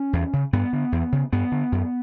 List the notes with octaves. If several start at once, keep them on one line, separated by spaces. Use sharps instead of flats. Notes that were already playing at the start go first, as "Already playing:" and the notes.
Already playing: C#4
E2
C#3
G2 B3
D3
E2
C#3
G2 B3
D3
F#2